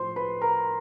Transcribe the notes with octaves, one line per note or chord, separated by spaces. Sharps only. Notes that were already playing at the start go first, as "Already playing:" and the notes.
Already playing: A2 F3 C5 C6
B4 B5
A#4 A#5